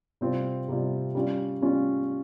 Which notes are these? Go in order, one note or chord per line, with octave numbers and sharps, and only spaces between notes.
C3 G3 C4 F4
C3 G3 C4 F4
G3 C#4 F4
G3 C#4 F4